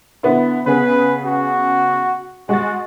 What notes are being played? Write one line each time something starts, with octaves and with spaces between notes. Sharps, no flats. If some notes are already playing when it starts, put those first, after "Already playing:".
D3 B3 E4
C#3 B3 G#4 B4
F#4
G#3 F#4 A6